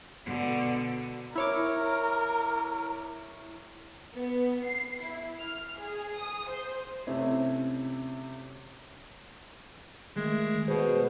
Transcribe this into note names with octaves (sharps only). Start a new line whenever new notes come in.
B2 D3
E4 A#4 C#5 D6
B3
C7
E4
F6
G#4
D#6
C5
C3 A3 C4 C#4 E4
D#3 G#3 A3
B2 G#4 C5